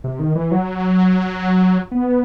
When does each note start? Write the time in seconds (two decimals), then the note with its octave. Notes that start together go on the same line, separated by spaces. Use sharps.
0.04 C3
0.19 D#3
0.35 E3
0.51 F#3
1.91 B3